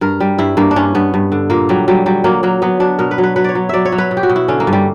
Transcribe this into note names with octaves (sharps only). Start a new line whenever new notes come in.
G2 A#4
G3
G2 E4
G2 A#3
D4
G2 C#4
G2 B3
G2
D3
A#2 A#3
F#3 G3
F#3 G3
F#3 G3
F#3 A#3
F#3 A#3
F#3 B3
F#3 D4
B2 A#4
B4
F#3
B4
F#3 B4
C#5 D5
F#3
F#3 D5 E5
C#5
F#3
B4
B2
G4
F#4
B2
E4
D3 C#4
A#3
G2
G3